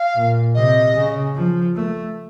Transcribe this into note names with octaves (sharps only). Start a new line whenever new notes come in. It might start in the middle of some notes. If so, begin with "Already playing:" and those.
Already playing: F5
A#2
C3 D#5
C#3
F3
A3